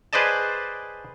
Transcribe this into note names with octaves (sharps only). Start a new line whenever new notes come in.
G#4 B4 C5 D5 D#5 A5